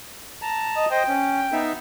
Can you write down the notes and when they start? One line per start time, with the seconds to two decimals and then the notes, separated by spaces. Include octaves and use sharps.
0.42 A5 A#5
0.76 D#5
0.91 C5 D#5 G5
1.08 C#4
1.52 B3 D#4 E5